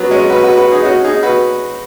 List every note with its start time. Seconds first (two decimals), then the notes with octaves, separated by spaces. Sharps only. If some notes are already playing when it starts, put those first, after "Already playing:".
Already playing: F#3 B3
0.11 G#3 C#4
0.30 F#4 B4
0.43 F#4 B4
0.58 F#4 B4
0.72 D#4 G#4
0.85 C#4 F#4
1.04 D#4 G#4
1.23 F#4 B4